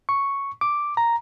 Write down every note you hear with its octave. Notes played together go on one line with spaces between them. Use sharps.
C#6
D6
A#5